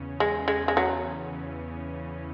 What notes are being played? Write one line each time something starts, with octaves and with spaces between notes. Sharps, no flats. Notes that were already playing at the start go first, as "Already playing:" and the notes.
Already playing: E2 C#3 C#4
E2 G#3
G#3 C#4
G#3
E2 F#3
E2
E3